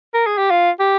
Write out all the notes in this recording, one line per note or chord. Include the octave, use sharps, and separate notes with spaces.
A#4
G#4
G4
F4
G4